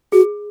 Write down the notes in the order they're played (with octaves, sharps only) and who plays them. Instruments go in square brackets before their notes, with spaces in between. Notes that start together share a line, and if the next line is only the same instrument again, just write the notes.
[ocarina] F#4 [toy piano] G#4